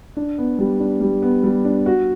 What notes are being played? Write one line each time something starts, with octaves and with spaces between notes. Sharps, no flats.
D4
B3
G3
D4
G3
B3
G3
D4
F#4